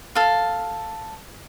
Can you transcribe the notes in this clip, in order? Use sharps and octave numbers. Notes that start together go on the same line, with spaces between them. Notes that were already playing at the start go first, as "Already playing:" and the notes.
A4 F5